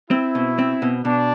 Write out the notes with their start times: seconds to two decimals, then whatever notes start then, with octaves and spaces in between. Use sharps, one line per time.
0.10 C4 E4
0.35 B2
0.59 C4
0.82 B2
1.04 B2 D4